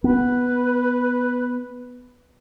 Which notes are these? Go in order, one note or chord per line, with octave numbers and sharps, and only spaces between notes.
B3 B4